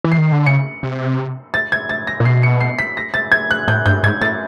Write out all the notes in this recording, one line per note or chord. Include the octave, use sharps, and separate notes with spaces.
E3
C7
D#3
D3
C#3 C#7
C3
A6
G#6
A6
A#6
A#2
B2 C7
C#7
C7
B6
A#6
A6
G#6
F#6
A2 G6
G2 G6
G#2 G#6
A2 A6